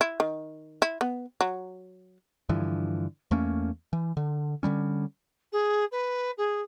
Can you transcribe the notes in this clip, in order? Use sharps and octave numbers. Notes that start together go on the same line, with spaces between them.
E4
D#3
E4
B3
F#3
G2 D3 E3 F3
E2 A3 A#3 C#4
E3
D3
D3 F#3 G3 C#4
G#4
B4
G#4